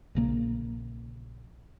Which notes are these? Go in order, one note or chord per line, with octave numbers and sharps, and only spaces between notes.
A#1 C#3 A#3